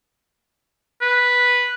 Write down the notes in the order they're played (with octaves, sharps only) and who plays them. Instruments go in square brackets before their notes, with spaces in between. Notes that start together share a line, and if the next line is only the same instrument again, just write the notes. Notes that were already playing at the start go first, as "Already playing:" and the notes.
[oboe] B4